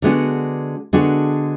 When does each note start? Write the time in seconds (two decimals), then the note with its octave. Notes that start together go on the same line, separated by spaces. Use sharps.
0.02 D3 G#3 B3 D4 F#4
0.93 D3 G#3 B3 D4 F#4